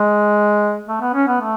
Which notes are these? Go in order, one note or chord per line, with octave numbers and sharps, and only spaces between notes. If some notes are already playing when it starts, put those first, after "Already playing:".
Already playing: G#3
A3
B3
C#4
B3
A3